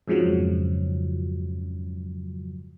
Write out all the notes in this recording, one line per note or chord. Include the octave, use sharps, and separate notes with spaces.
F2 G#2 C#3 F3 F#3